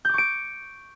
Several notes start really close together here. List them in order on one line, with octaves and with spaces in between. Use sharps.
G6 D6 C#6 D7